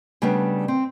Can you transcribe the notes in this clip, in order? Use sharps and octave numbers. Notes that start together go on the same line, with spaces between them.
C#3 G3 A3 B3 D4
C4